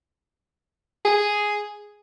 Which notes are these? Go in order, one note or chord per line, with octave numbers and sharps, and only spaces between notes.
G#4